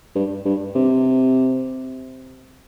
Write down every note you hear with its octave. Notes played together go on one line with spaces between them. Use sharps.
G2
G2
C3